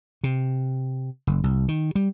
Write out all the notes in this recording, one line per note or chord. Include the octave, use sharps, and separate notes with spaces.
C3
F#1
C2
D#3
G3